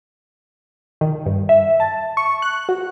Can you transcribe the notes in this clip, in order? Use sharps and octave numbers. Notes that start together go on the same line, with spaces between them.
D#3
G2
E5
A5
C#6
F#6
F#4